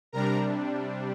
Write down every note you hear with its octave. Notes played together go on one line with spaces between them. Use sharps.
C3 G3 D4 A#4 A#5